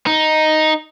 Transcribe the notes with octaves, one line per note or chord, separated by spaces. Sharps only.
D#4